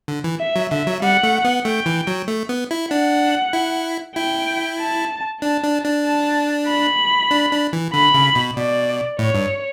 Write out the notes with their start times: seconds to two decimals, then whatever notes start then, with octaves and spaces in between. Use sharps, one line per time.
0.08 D3
0.24 E3
0.40 E5
0.56 F#3
0.71 D3 E5
0.87 F#3
1.02 G3 F#5
1.24 A3
1.44 B3
1.65 A3 G5
1.86 E3
2.07 F#3
2.28 A3
2.49 B3
2.71 E4
2.91 D4 F#5
3.53 E4
4.16 E4 G5
4.79 A5
5.42 D4 A5
5.64 D4
5.84 D4
6.06 A5
6.68 B5
7.31 D4
7.52 D4
7.73 E3
7.93 D3 B5
8.14 C#3
8.35 B2
8.56 B2 D5
9.19 A2 C#5
9.35 G2